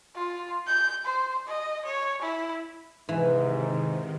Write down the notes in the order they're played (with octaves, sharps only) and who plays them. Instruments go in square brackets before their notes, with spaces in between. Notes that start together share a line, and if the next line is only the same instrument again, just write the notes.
[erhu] F4
G6
C5
D#5
C#5
E4
[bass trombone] G#2 [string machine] C3 D#3 [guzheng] E3